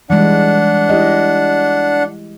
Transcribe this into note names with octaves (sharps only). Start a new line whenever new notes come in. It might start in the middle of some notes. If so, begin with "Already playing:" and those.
E3 G3 G#3 D4 F#5
E4 G4 D#5